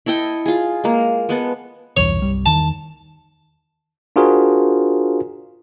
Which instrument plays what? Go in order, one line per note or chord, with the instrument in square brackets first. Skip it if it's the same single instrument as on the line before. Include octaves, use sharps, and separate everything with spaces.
[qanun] E4 A4 D#5 G5
F4 G#4
G#3 A#3
G#3 B3 A4
[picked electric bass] B1 E2 G2 [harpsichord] C#5
[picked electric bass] G1 C2 G3
[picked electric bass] E2 D#3 [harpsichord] A5
[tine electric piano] D4 F4 F#4 G#4 A#4 C5